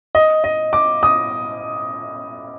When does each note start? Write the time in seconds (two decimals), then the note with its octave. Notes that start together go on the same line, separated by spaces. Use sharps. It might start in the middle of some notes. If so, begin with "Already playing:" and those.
0.15 D#5
0.44 D#5
0.73 D6
1.03 D#6